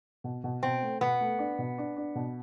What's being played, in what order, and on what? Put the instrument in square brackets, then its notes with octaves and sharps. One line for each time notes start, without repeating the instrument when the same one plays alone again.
[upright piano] B2
B2
[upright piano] B2 [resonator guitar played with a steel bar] C4
[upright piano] A3
[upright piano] B2 [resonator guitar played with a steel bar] B3
[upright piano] A3
D4
B2
D4
D4
B2